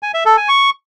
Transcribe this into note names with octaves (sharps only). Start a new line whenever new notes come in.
G#5
E5
A4
G#5
C#6